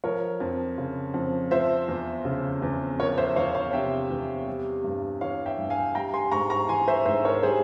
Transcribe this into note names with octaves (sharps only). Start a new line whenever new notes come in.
F3 A#4 C#5
F2
C#3
F2
F3 C5 E5
E2
C#3
E2
F3 A#4 C#5
C5 E5
E2 C#5 F5
C#5 F5
C3 E5 G5
E2
G3
G2
E3 C#5 F5
E5 G5
G2
F5 G#5
G3 G5 A#5
G#5 C6
G#2 A#5 C#6
A#5 C#6
E3 G#5 C6
C5 E5
G#2 C5 E5
A#4 C#5
G3 G#4 C5